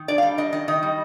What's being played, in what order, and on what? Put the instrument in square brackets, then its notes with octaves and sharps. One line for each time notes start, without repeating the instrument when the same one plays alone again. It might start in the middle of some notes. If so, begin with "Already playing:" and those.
Already playing: [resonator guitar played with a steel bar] D#3
D4 D5
F5
G3
D4 D#5
D#3 D#5
D#3 D#5
G3